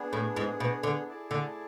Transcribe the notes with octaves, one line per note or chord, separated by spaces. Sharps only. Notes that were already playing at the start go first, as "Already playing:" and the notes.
Already playing: B3 D4 G#4
A2
G#2
B2
D3
E4 G#4 D5 A5
D3